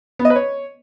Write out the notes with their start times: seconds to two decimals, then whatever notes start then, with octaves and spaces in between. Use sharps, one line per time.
0.19 B3
0.25 D#5
0.30 B4
0.36 C#5